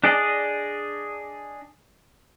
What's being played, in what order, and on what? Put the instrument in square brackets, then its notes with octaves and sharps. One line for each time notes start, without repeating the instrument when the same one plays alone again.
[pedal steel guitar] D4 G#4 D5 D#5